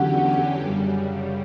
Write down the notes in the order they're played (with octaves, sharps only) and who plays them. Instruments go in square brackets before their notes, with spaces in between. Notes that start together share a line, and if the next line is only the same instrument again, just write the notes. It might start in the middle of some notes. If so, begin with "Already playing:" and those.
Already playing: [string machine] E2 D3 F#3 C#4 G4 [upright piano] F#5
[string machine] F#2 C#3 G3